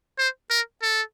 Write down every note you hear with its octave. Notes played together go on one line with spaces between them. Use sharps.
C5
A#4
A4